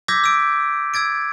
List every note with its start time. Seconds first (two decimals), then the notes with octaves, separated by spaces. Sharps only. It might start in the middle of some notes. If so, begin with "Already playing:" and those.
0.08 D6 E6 G6 G#6 A#6 B6
0.24 E6 D7
0.94 E6 G#6 A6 D7